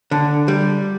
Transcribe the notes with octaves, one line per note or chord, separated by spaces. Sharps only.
D3
G3